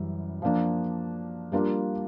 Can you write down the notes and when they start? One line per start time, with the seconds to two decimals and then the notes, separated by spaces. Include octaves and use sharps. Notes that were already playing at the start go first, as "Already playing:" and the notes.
Already playing: F#2 E3 G3
0.42 F3 A#3 D4
1.52 G3 A#3 D4 F4 A#4